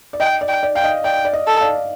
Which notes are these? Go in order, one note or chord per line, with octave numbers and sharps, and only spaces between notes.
D5
D#5 G5
D5
G5
D5
F5 G5
D#5
D5 G5
D5
D#5
A4
D5 F5